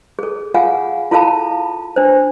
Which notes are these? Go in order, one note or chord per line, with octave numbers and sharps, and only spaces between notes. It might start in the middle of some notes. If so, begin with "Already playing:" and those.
G#4 A4
F4 G#4 F5 F#5 G#5
E4 F4 A4 F5 A5 B5
D4 C5